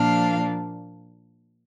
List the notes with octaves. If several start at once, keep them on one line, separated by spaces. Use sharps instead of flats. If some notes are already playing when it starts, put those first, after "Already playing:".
Already playing: A#2 F3 A#3 D4 F5